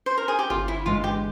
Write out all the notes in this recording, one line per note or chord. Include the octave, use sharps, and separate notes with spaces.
C5
A#4
G#4
G4
G1 F4
E4
G2 E3 G#3 F4
G4